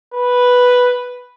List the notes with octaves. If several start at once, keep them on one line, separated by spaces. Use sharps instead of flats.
B4